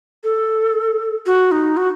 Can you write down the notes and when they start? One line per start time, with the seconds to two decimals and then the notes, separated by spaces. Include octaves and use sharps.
0.24 A4
1.26 F#4
1.52 D#4
1.77 F#4